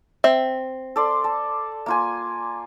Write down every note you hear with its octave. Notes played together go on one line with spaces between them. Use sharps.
C4 E5
A4 D5 C6
A5
A#3 F4 G#5